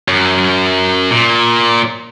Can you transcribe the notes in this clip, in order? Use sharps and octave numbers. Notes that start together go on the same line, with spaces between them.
F#2
A#2